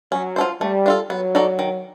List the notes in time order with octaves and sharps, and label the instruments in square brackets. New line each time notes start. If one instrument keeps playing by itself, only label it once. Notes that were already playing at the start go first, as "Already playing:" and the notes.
[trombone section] F#3 [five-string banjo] C#4
[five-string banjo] F4 A4 C5
[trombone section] G3 [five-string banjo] A3
[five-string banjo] D4 F4 A4
[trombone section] F#3 [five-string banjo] B3
[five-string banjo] D#4 F#4 A4 D5
D#3